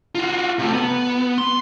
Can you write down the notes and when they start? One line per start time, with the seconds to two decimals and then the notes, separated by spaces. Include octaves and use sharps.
0.15 F4 F#4
0.59 C3 A3
0.73 B3
1.38 C6